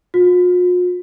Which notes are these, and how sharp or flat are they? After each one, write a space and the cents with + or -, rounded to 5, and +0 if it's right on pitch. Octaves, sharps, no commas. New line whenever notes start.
F4 +45